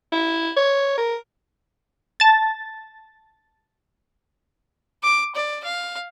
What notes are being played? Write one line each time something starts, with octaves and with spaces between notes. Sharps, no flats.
E4
C#5
A#4
A5 A6
D6
D5
F5